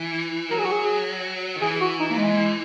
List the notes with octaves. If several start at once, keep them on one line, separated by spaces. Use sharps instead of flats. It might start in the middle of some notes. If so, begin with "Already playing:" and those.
Already playing: E3
F#3 A#4
G#4
F#4
G#4
D#3
E3 G#4
F#4
D#4
A#3
G#3